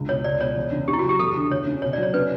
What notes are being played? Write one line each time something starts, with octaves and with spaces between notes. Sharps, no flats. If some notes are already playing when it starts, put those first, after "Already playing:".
Already playing: C#2 D3
B2 C#5
C#2 D5
B2 C#5
E2
C#3
C#3 G4
E4
F#4
F#3 G4
E2 A4
D3
D2 C#5
C#3
B2 C#5
D5
F#3
C#5
C#3 B4